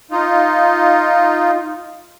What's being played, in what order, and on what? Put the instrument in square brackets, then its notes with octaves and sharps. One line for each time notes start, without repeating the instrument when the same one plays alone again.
[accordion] D#4 F4